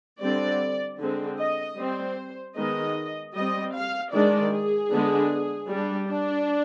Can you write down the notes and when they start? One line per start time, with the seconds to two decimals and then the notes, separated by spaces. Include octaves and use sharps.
0.21 D3 G3 C4 D5
1.00 D3 G#3 C4
1.39 D#5
1.78 G3 C4 C5
2.56 D#3 G#3 B3 D#5
3.35 G3 C4 D#5
3.74 F5
4.13 D#3 G#3 D4 D5
4.52 G#4
4.92 D3 G#3 B3 D4
5.70 G3 D4
6.08 D4